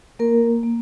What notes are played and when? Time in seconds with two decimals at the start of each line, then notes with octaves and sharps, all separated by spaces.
0.19 A#3 A#4
0.63 A#3